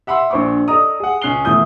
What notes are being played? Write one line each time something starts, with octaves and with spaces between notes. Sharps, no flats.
E5 F#5 B5 C6 E6
A#1 D4 C5 B5 C#6 D6
A4 D5 D#5 A#5 D#6
G#4 F#5
C#2 C#4 F#6 C7 G7
D#1 E2 A3 E4 D#6 G6